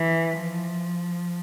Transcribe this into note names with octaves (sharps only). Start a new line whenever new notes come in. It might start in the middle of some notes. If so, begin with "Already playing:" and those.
Already playing: E3
F3